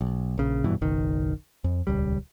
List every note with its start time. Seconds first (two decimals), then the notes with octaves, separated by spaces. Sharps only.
0.01 B1
0.38 A#1 C#3
0.64 F1 G2 B2 E3
0.81 F#1 B1 D#3
1.64 F2
1.87 D#1 C#2 G3